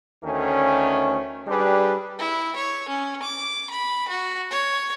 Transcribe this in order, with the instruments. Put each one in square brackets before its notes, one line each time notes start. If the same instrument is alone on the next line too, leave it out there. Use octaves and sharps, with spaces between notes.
[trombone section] D2 D#3 A3 C#4
G3 D4 G4 G#4 B4
[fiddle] E4
C#5
C#4
D6
B5
F#4
C#5